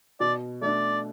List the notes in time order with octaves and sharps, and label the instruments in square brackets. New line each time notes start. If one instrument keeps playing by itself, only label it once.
[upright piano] B2 [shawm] D5
[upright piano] A3 D4 [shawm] D5